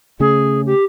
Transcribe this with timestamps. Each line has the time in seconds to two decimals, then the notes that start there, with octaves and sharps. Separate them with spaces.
0.20 C#3 A3 C#4 G#4
0.66 G4